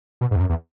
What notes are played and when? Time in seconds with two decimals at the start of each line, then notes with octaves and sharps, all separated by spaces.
0.21 B2
0.31 G#2
0.36 E2
0.40 F#2
0.49 E2